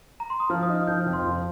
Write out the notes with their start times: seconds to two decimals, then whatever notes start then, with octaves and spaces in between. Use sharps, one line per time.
0.20 A#5
0.30 C6
0.40 D#6
0.50 F3 F6
0.63 D#6
0.69 D#4
0.75 F6
0.87 F3 G6
1.01 F6
1.06 F2
1.13 C6
1.25 F3